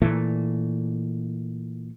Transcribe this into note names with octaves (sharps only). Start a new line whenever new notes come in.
A#2 E3 A3